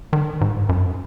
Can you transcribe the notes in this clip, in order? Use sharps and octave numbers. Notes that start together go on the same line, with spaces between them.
D#3
G#2
F#2